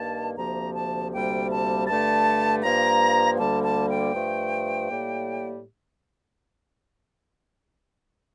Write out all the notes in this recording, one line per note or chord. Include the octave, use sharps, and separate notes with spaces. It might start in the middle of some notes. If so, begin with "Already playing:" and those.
Already playing: G2 D#3 A#3 A5
D2 C3 F3 A#3 A#5
A5
D2 C3 G3 A#3 G5
A5
G2 D3 A3 A5
G2 F3 A#3 A#5
D2 D3 G3 A#3 A5
A5
G5
G2 F3 A3
A2 G3 A#3